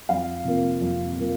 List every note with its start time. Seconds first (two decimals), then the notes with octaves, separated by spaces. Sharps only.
0.09 F2 F5
0.45 C3 F3 A#3
0.81 F2
1.17 C3 F3 A#3